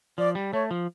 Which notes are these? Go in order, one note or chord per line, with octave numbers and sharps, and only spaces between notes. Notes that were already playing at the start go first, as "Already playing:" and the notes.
F3 D5
G3
A3 C#5
F3